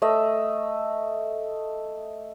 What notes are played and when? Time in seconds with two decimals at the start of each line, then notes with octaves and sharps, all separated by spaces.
0.02 A3 D#5 E5